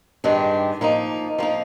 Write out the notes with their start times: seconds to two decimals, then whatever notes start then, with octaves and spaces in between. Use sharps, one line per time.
0.24 G2 D#3 G#3 D4 G4
0.81 F3 A#3 D#4
1.38 F3 A#3 D#4